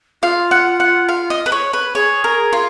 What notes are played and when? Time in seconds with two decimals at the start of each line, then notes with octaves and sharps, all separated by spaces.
0.22 F4 F5
0.51 F#5
0.80 F#5
1.09 F5
1.30 D#5
1.46 B4
1.52 C#5
1.73 B4
1.95 G#4 C#5
2.24 A#4
2.53 F4